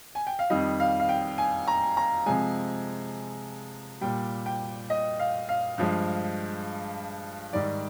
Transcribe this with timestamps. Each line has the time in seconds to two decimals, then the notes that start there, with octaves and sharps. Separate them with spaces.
0.15 G#5
0.27 G5
0.39 F5
0.50 F2 D#3 G3 D#5
0.80 F5
1.00 F5
1.09 G5
1.38 G#5
1.67 A#5
1.97 A#5
2.26 C3 F3 G#3 G#5
4.01 A#2 G3 G5
4.46 G5
4.90 D#5
5.19 F5
5.49 F5
5.78 G2 F3 G#3
7.53 G#2 D#3 G3 D5